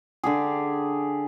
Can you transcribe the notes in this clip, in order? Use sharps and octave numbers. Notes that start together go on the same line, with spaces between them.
D3 G4 G#4